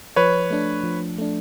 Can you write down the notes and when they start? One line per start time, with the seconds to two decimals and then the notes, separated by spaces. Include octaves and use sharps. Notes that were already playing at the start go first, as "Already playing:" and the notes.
0.16 F3 B4 C#5
0.50 A3 D4
0.83 F3
1.18 A3 D4